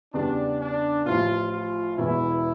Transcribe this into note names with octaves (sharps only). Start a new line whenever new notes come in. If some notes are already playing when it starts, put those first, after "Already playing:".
E2 C#3 G3 D4
D4
A1 A2 F3 F4
F4
E1 E2 E3 E4